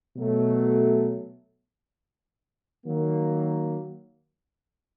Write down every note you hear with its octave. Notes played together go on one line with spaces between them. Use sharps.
B2 F#3 A3
D#3 F#3 A#3